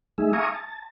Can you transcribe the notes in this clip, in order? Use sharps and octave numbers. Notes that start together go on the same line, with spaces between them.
G#3 A3 D#4 G#4 E5
E5 F5 G#5 A#5 C#6 D#6
A5